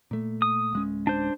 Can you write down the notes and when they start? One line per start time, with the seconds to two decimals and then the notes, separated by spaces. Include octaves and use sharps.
0.11 A#2 A3
0.42 D#6
0.73 D1 G#3 C#4
1.07 D4 C5